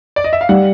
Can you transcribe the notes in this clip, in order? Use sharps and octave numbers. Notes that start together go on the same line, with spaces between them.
D5
D#5
E5
F5
G3 F#5